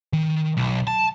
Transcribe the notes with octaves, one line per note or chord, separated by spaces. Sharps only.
D#3
B1
A5